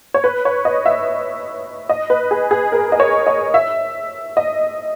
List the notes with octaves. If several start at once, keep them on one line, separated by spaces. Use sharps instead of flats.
C#5
B4
C#5
D#5
E5
D#5
B4
G#4
G#4
A#4
D#5
C#5
D#5
E5
D#5